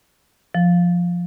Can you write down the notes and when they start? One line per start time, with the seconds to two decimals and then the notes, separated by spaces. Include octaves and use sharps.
0.55 F3